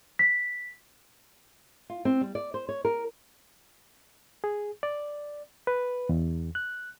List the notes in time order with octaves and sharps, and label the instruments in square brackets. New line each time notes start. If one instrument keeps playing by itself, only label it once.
[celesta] B6
[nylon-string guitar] F4
C4
G3
D5
C5
C#5
A#4
[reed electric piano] G#4
D5
B4
E2
F#6